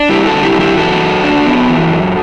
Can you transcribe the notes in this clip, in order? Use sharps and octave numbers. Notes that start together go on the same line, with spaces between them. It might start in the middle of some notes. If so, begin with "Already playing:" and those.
Already playing: D4
G3 E4 G4
F#4 A4
D3
E4 G4
F#2
E4 G4
E3 F#4 A4
F#2
D4
B3
E3
F#2